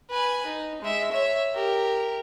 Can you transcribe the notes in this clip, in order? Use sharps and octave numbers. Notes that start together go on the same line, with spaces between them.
B4 G#5
D#4
G#3 E5
C#5 E5
G4 A#4